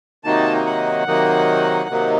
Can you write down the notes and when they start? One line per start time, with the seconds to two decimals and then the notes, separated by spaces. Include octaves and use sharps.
0.24 C3 D#3 F#3 A#3 D#4 A5
0.66 F#5
1.07 C3 D#3 F#3 A#3 D#4
1.89 C3 D#3 F#3 A#3 D#4